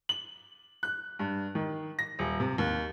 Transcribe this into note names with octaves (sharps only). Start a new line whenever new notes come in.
F#7
F#6
G2
D#3
A#6
D#1
C3
D#2